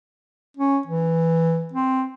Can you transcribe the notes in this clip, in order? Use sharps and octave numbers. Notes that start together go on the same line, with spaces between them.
C#4
E3
C4